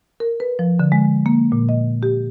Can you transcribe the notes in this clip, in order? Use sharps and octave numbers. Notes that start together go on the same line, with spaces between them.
A#4
B4
F3
D3
G#3
A#3
A#2
D#5
G4